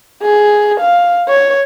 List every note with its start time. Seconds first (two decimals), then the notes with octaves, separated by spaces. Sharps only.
0.22 G#4
0.80 F5
1.29 C#5